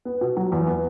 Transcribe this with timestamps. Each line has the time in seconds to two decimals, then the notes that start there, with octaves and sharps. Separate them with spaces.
0.05 B3
0.21 B2
0.37 F#3
0.52 E2
0.67 B3